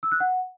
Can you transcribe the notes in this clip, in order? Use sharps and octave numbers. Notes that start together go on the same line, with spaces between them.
E6
F#6
F#5